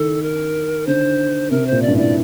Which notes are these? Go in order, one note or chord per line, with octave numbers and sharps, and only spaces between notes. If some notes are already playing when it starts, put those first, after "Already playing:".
Already playing: D#3 A4
A#4
D3 C5
C3 A#4
C5
A#2
D5
G2
A2 D5